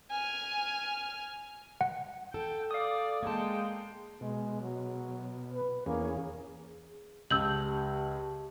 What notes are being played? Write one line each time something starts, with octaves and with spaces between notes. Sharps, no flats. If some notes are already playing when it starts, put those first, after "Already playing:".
G#5 F6
F#5
A4 G5
D5 F5 D#6
G#3 A#3 G5 A5
B2 G#3
F#3
B4
E2 A#3 C#4 G#4
G#4
C#2 G4 A5 C#6 E6 G6 F#7